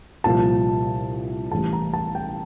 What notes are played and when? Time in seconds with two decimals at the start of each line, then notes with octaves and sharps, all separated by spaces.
0.24 C2 A#2 F3 A5
1.52 A1 A2 E3 G3 A5
1.73 A#5
1.94 A5
2.15 G5